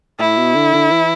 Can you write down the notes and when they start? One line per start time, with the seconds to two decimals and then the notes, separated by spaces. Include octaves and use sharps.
0.20 A2 E4
0.38 B2
0.55 D3
0.74 D3
0.92 E3